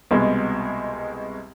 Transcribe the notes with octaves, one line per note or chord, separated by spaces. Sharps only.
C2 B2 G#3